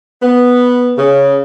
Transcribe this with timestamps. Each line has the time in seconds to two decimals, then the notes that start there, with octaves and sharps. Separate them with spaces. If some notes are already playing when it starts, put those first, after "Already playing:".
0.22 B3
0.98 C#3